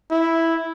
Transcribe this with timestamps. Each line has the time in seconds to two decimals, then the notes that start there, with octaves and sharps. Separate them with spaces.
0.11 E4